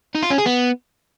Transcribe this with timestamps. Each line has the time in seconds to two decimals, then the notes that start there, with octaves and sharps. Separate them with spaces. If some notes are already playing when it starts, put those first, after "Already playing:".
0.15 D#4
0.23 F4
0.30 C#4
0.38 G#4
0.46 B3